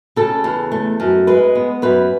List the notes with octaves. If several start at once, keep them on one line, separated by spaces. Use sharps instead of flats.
C#3 A4
E2
A3
F#2
G#3 B4
B3
F#2 B4